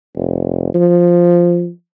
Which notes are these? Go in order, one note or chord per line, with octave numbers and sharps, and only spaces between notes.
F1
F3